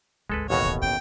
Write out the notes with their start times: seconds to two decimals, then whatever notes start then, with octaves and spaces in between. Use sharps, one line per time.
0.30 G#1 D2 G#3 A4 B4
0.50 A1 D#2 B2 F#4 C#5
0.66 D1
0.82 B3 C#4 G5